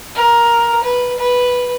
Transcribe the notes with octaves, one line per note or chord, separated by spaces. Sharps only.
A#4
B4
B4